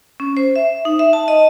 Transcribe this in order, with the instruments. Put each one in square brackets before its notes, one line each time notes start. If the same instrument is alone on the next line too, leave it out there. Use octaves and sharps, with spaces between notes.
[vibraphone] C#4
C5
E5
D#4
E5
A5
D#5